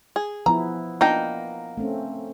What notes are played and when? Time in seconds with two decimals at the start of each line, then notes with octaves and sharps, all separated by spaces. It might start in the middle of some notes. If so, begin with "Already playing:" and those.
0.16 G#4
0.46 F3 B3 E4 A#5
1.01 A#3 B3 D4 D#4 F4 G5
1.77 A3 C4 C#4